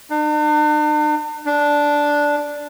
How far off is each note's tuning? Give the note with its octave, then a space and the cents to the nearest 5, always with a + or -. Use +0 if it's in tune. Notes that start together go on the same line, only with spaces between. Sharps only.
D4 +45
D4 -5